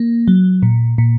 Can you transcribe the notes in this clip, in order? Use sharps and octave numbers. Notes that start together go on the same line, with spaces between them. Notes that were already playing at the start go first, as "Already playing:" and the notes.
Already playing: A#3
F#3
A#2
A#2